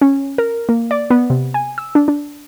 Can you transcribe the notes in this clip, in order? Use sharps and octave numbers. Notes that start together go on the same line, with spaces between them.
C#4
A#4
A#3
D5
B3
C3
G#5
E6
D4
D4